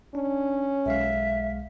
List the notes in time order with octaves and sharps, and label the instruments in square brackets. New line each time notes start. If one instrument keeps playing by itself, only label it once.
[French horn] C#4 [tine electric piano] D4
[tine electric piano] B1 G#3 F5 [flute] E5